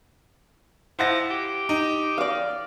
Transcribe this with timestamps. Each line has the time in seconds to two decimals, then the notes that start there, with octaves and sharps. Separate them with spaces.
0.99 F3 E4 F#5 A#6
1.30 G4
1.69 D#4
2.18 D5 F5